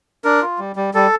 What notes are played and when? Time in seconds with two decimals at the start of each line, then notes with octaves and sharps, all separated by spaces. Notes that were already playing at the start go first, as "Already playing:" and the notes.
0.24 D4 A#4
0.42 F4
0.59 G3
0.76 G3
0.94 G3 A4